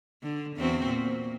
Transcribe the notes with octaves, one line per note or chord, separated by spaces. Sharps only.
D3
E2 C4 F#4
A#2